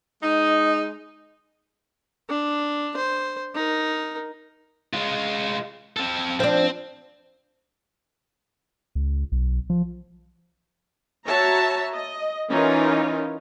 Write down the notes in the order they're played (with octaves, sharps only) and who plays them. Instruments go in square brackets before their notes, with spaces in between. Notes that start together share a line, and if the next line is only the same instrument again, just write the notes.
[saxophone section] G#3 D#4
[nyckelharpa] D4
C5
D#4 A#4
[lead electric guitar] G#3 F4
C4 A4
[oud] F3 D4 [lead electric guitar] C4
[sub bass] C#2
B1
F3
[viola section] F#4 C#5 E5 A5 A#5
D#5
E3 C#4 D#4 F4 A#4